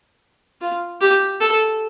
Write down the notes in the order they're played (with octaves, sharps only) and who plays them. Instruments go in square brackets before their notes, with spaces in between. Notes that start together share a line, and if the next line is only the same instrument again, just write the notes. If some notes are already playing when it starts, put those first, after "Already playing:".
[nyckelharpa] F4
G4
A4